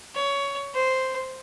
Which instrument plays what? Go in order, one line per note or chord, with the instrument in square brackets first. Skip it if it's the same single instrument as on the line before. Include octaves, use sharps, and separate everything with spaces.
[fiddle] C#5
C5